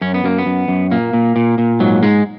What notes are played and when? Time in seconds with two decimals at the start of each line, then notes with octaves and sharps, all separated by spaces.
0.01 F#2 C#4
0.14 B3
0.24 F#2 A#3
0.38 B3
0.46 F#2
0.68 F#2
0.91 A#2 A#3
1.13 A#2
1.36 A#2
1.58 A#2
1.80 G#2 F#3
2.02 G#2 G#3